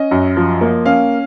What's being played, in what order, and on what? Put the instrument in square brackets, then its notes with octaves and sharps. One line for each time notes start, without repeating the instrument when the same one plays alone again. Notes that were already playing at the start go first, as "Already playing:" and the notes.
Already playing: [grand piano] C#4 D#5
F#2
F3
A#3
C#4 F5